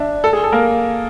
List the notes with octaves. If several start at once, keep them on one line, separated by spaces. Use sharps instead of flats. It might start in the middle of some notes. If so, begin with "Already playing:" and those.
Already playing: D4 E5
A4
G#4
A4
A#3 A#4